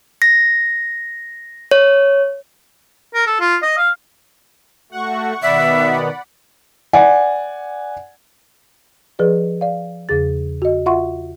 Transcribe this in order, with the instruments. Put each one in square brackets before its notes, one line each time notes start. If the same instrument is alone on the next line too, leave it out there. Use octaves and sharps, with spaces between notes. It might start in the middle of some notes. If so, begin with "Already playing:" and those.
[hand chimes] A#6
C#5
[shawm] A#4
A4
F4
D#5
F5
[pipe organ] A3 F#4 [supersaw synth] F#5 C#6
[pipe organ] B2 D#3 B3 [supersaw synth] D5 F#5 B5 [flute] E5
[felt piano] D5 F#5 G#5
[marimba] F3 G#4 B4 D5
D5 F5
E2 C#3 G#4 A6
F#4 D#5
F4 E5 F#5 C6 C#6